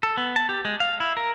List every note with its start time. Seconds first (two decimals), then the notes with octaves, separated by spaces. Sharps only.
0.03 A4
0.17 B3
0.36 A5
0.49 G4
0.65 G#3
0.80 F5
1.00 E4
1.17 A#4